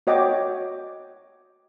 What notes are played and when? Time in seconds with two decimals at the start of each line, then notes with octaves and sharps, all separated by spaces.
0.07 F#4 C#5 D#5 F#5 G5 D6